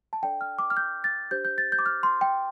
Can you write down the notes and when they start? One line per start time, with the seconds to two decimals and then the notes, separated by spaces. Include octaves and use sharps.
0.13 A5
0.23 D4 A4 D5 G5
0.41 F6
0.59 D6
0.70 F6
0.77 G6
1.04 A6
1.31 D4 G4 C5 G6
1.45 G6
1.58 A6
1.72 G6
1.79 D6
1.86 F6
2.03 C6
2.21 G5